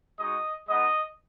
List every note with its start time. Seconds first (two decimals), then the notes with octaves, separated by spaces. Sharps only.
0.19 G#3 D#4 F#4 D#5
0.68 G#3 B3 D#4 D#5